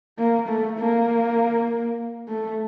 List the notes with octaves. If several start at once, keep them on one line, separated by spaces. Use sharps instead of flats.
A#3
A3
A#3
A3